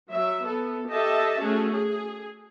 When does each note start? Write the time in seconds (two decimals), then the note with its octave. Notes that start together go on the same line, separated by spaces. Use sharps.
0.13 F#3 E5
0.43 B3 A4
0.89 G4 A4 D#5 E5 A5
1.39 A3 C#4 F#4 G#4
1.71 G#4